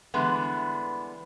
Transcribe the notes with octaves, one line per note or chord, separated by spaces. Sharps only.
D3 E3 G3 G#3 B3